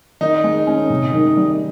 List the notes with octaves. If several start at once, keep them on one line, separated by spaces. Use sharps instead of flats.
D#3 D#4
G#3
C#4
C3
D#3
G3